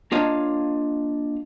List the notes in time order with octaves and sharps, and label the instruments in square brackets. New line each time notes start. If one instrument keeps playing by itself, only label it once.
[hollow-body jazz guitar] A#3 D4 F4 C#5 D#5 F5